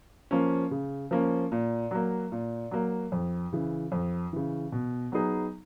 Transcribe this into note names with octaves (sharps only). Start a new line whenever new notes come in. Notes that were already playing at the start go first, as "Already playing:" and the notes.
F3 A#3 C#4
C#3
F3 A#3 C#4
A#2
F#3 A#3
A#2
F#3 A#3
F2
C#3 E3
F2
C#3 E3
B2
F#3 B3 D#4 G#4